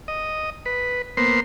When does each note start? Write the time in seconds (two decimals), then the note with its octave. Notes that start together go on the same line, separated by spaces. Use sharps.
0.08 D#5
0.66 B4
1.17 A#3 B3 C5 C6